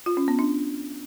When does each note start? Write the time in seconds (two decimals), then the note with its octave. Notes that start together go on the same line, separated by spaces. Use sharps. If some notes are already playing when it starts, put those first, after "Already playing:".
0.06 F4
0.17 C#4
0.28 B3
0.39 D4